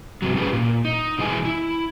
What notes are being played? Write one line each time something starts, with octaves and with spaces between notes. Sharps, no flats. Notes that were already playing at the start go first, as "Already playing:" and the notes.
G2 C3 F#3
C#4 F4 G4 G#4 B4
A#2
D#4
B2 E3 G#3 G#5
E4